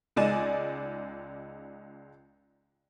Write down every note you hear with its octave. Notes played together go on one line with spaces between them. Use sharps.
C#2 G#3 D#4 D5 G#5 E7